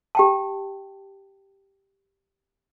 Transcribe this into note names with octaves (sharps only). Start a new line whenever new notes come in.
G4 G5 A5